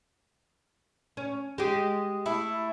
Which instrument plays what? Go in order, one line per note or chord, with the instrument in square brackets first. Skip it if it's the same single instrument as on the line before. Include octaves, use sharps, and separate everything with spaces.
[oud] C#4
G#3 G4
[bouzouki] A3 E4